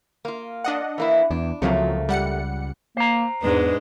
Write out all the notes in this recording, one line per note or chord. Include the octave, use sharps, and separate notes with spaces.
A#3 F4
D4 D#5 F#5
E3 A#3 E4
E2 D4
C#2 C3 F3 F#3 A3 A#3
G3 F#5 C#7
A#3 C5 A#5
E2 G#2 G#3 D4 B4